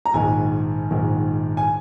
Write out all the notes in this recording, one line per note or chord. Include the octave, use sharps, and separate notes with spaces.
A#5
A#1 G#2 D#3 G#5
A#1 G#2 D#3
G#5